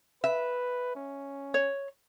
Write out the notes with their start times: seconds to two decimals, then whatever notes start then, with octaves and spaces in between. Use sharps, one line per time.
0.24 B4 E5
0.96 C#4
1.54 C#5